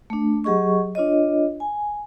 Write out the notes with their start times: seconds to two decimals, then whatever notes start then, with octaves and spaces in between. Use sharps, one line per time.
0.10 A3 D4
0.44 F#3 G4 G#4 D#5 C#6
0.95 D4 F4 C#5 D#5
1.60 G#5